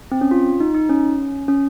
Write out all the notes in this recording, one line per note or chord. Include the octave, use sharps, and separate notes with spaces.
C4
C#4
F4
D#4
D#4
C#4
C#4